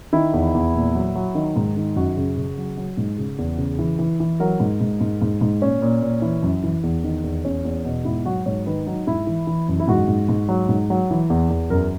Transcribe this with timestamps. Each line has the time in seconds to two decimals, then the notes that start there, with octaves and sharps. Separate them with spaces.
0.13 D#3 E4
0.33 E2
0.54 E2
0.75 A#2
0.95 F#3
1.15 F#3
1.35 D#3
1.56 G#2
1.76 D#3
1.96 F#2 F#4
2.17 C#3
2.37 C#3
2.57 F#3
2.77 F#3
2.97 G#2
3.18 C#3
3.38 E2
3.58 C#3
3.79 E3
3.99 E3
4.20 E3
4.40 F#3 A#4
4.60 G#2
4.81 G#2
5.01 G#2
5.22 G#2
5.41 G#2
5.61 A#2 C#4
5.82 A#2
6.02 A#2
6.22 E3
6.43 F#2
6.63 E3
6.83 E2
7.04 D#3
7.23 E2
7.45 E2 C#4
7.65 E2
7.85 B2
8.05 G#2 E4
8.25 F#3 F#4
8.46 G#2 C#5
8.66 D#3 B4
8.86 F#3 D#4
9.07 G#2 E4
9.27 E3
9.47 E3
9.68 F#2
9.80 E4
9.88 G#2 F#4
10.08 G#2
10.29 G#2
10.48 F#3
10.69 G#2
10.90 F#3
11.11 E3
11.30 E2
11.50 E2
11.70 F#2 A#4